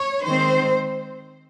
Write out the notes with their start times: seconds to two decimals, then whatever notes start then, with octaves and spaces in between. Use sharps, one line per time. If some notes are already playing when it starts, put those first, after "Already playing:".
Already playing: C#5
0.25 D#3 G#3 C4 C5